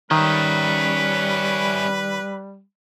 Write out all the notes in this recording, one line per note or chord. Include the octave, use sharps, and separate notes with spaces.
D#3 G3 C#4 B4 E5